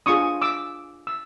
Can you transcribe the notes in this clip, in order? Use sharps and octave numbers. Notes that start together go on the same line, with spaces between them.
D4 F4 G#4 C#6 D#6
D6 E6
E6